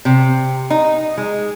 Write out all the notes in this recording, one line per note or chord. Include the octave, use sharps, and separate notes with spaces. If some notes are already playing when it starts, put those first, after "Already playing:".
C3
D#4
G#3